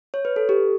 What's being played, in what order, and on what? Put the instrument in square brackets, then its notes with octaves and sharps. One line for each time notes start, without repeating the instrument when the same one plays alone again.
[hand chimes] C#5
B4
A4
G4